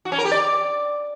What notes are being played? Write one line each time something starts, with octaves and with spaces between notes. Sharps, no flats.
F#4
C#4
A#4
G4
D5